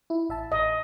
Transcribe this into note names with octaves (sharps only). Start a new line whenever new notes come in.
E4
A1 E5 A5
A1 D#5